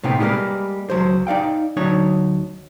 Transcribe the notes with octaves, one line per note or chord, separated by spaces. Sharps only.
A2 C3 B3 C4 D#4 G5
G3 G#3 A#3 F#4 A#4 B4
C#2 F#3 C5
D#4 D5 F5 G5
D2 F#3 D4 D#4 C#5